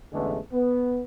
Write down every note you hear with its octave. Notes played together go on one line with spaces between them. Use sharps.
A1 E2 D3 G#3 A3
B3